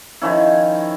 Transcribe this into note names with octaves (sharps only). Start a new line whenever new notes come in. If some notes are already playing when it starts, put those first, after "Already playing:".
D#3 F3 C#4 E4